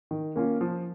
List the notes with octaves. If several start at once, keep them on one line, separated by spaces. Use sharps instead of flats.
D#3
A#3 C#4 F4
F3